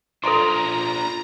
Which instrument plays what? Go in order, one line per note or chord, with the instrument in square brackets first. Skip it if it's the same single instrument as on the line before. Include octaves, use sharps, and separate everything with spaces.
[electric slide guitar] D4 F4 C5 [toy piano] A4 G#5 C6 [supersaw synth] A#5